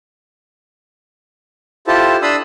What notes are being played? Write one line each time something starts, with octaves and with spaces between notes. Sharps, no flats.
E4 F4 G4 A4 C5 A5
D4 A5 B5 C6 D#6 E6